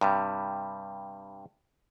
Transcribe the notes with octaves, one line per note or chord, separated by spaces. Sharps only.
G2 C3 G3